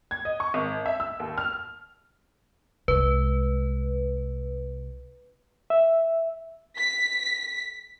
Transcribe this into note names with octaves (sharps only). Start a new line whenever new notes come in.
G#6
D#5
C#6
G#1
E5
E6
D#2
F6
C2 G#3 B4
E5
B6